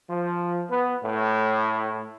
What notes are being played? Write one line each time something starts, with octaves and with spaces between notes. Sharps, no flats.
F3
B3
A2